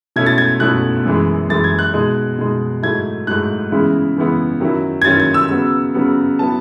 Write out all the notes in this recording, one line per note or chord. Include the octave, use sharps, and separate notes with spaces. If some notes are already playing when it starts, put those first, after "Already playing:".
B2 A3 C#4 E4 G#6
A6
G#6
B2 A3 C#4 E4 F#6
F#2 E3 G#3
F#2 E3 G#3 A6
G#6
F#6
B2 G#3 D#4
B2 G#3 D#4
G#2 F#3 A3 E4 G#6
G#2 F#3 A3 E4 F#6
C#3 E3 G#3 B3 E4
C#3 E3 G#3 B3 E4
D#3 F#3 C#4 E4
G#6
D#3 F#3 C#4 E4 A6
G#6
E6
C#3 F#3 B3
C#3 F#3 B3
F#3 B3 E4 A5